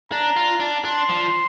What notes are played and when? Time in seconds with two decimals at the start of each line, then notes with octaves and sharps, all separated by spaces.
0.12 D4 A#5
0.36 F4
0.60 D4
0.85 D4 C6
1.09 F3